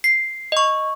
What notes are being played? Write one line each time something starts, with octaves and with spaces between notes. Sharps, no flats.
C7
D#5 C#6